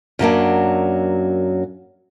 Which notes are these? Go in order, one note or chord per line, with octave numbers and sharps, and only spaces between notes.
F#2 F#3 A#3 D4